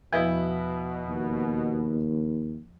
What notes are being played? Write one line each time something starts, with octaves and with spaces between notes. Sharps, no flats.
E2 B2 F3 E4 B4 D#5
D#2